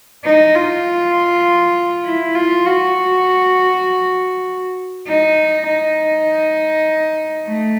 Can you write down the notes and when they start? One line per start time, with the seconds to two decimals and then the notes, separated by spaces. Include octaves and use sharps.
0.25 D#4
0.55 F4
2.05 E4
2.35 F4
2.66 F#4
5.07 D#4
5.67 D#4
7.48 A3